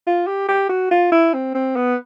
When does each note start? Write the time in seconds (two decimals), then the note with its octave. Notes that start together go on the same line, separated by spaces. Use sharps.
0.07 F4
0.27 G4
0.49 G4
0.69 F#4
0.91 F4
1.12 E4
1.33 C4
1.54 C4
1.76 B3